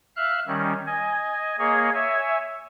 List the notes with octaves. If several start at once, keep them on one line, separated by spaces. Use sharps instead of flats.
E5 F5 F6 F#6
D#3 G3 C#4
D#5 G#5
A#3 G#4 C#5 D#5 G#5
C#5 E5 G#5